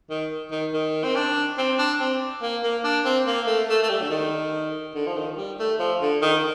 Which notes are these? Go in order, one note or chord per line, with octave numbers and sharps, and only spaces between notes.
D#3
D#3
D#3
C4
D4
C4
D4
C4
A#3
A#3
D4
C4
A#3
A3
A3
A3
G3
D3
D#3
D3
F3
D#3
G3
A3
F3
D3
D#3